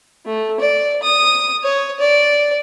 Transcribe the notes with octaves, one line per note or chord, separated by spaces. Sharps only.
A3
D5
D#6
C#5
D5